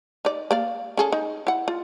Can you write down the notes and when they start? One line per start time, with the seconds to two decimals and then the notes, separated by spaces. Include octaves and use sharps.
0.25 D#4 D5
0.51 A#3 D5 F5
0.97 C#4 G#4 A4
1.12 D#4
1.47 E4 F#5
1.68 F4